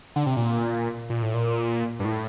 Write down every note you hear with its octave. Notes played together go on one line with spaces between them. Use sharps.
D3
C3
A#2
A#2
A2
A#2
G2
A2